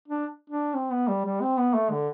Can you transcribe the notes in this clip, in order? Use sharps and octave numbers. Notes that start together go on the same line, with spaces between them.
D4
D4
C4
B3
G3
G3
C4
B3
A3
D3